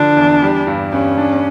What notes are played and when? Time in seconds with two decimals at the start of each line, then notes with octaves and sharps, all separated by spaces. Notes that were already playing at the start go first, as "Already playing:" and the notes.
Already playing: D3 F3 D4
0.17 E2
0.42 G3
0.67 G2
0.92 G2 C#4
1.18 D4